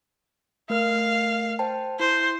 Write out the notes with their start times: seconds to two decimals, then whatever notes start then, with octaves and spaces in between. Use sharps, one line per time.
0.70 A3 A#4 F5 F6
1.59 C5 G5 A5
2.00 E4 C5